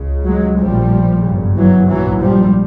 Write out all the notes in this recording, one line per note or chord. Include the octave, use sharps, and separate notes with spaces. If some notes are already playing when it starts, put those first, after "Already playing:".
Already playing: C#2 C#3
F#3 G#3
A#1 A2 F3 G3
G1 F#2 C#3
E3 F#3
A#1 G#2 E3 F#3
F3 G3